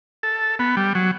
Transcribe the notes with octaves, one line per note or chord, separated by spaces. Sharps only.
A4
B3
G3
F#3